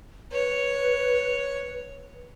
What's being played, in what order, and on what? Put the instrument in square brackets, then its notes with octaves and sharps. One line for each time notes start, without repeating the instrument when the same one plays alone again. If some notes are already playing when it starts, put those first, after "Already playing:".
[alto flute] B4 [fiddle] C#5